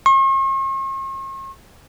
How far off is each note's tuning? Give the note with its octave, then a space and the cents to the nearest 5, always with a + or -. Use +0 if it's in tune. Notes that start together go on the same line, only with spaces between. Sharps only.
C#6 -45